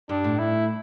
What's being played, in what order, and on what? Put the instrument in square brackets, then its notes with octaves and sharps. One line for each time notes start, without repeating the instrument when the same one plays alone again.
[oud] G2 [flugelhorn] D4
[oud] A2
[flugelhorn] E4